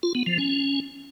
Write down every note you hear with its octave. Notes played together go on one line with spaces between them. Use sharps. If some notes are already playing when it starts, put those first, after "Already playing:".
F4
B3
F3
C#4